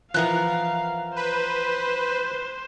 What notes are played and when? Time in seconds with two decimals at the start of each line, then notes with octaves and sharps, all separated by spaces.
0.14 E3 F3 B3 A#4 F5 F#6
1.16 B4 C5